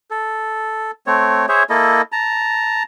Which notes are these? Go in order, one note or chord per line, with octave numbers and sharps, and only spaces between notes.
A4
A3 C4 C#5
G#4 C5 C#5 E5
A#3 E4 A4 D#5
A5 A#5